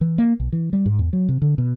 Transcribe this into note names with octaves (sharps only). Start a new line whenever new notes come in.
E3
A#3
B1
E3
G3
G#2
E2
F#3
C3
D3
B2